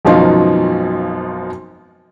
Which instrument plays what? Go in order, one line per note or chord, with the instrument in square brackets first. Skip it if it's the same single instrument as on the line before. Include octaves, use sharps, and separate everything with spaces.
[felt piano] G#1 F#2 B2 F3 D#4 F4